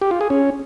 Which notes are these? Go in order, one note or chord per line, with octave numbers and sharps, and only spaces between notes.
G4
F4
G#4
C#4